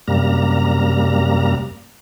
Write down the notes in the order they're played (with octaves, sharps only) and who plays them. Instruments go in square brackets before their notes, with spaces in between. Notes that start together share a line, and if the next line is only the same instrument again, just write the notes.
[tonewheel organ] F#2 C3 G3 A#3 A#5